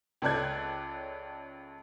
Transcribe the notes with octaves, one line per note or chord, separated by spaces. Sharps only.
C#2 C#4 A4 D5 F#6 G#6